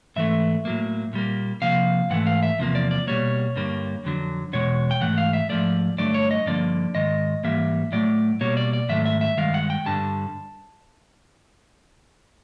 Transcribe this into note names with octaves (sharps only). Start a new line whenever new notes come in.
G#2 E3 A3 E5
A2 F#3 A#3
A#2 G3 A#3
C3 F3 A#3 F5
G#2 E3 A3 F#5
F5
E5
E2 C3 F3 A#3
D5
D5
B2 G3 A#3 C#5
G2 D3 G3 A#3
F2 D3 F#3
E2 B2 G#3 C#5
G5
G#2 E3 A3 F#5
F5
E5
G#2 F3 A3 D5
G2 D3 F#3 A3 D5
C#5
D#5
G2 D3 F3 A#3 D5
G#2 D#3 G#3 D#5
G#2 E3 G3 A#3 E5
A2 F#3 A3 D5
B2 G3 A#3 C#5
D5
D5
G#2 D#3 F#3 A3 E5
E5
E5
G2 D#3 G#3 F5
F#5
G5
G2 D3 G3 A5